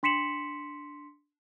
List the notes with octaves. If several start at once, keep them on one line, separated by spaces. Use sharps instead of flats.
D4 C6 B6 C#7 E7 F#7